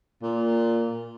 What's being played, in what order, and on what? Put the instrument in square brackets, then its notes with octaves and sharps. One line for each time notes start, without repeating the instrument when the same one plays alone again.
[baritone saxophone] A#2